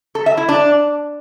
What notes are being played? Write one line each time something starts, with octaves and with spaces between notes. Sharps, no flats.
A4
E5
E4
D4